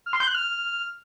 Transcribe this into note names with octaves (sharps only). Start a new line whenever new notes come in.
F6
C6
G6
F#6
F6